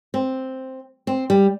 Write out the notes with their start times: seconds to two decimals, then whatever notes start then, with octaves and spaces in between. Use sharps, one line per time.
0.14 C4
1.07 C4
1.30 G3